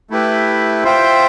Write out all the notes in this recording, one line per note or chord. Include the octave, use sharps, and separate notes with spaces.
A3 E4 G4 B4
F4 C5 E5 G5